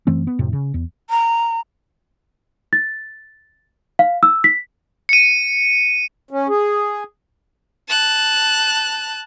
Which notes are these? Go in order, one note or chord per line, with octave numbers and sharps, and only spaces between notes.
F#2 E3 A3 C4
B3
F2 A2 C3
C#3
E2
A#5
A6
F5
E6
B6
C#7 D#7
C#4
G#4
A5 F#6